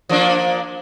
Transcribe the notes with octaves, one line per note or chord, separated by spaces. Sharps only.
F3 A#3 D4